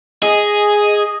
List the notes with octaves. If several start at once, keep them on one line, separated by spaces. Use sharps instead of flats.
G#4 D#5